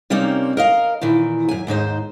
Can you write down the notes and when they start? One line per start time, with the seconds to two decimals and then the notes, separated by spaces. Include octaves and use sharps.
0.10 C3 G3 A#3 C4 C#4 D#4
0.57 A#4 D#5 F5
1.01 A#2 D#3 E3
1.49 F#2 G#5
1.67 D#2 G#2 D#4 C5